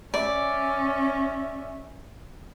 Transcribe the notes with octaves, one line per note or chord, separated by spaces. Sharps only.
C#4 D5 E5